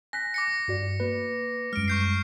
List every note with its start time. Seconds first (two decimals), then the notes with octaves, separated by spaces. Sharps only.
0.13 G#5 F#6 A#6 B6
0.34 D6 A#6 C#7
0.68 G2 F#4 D5
1.00 A#3 B4
1.73 F#2 G3 G#3 F6 D7
1.88 C#6 G6 C7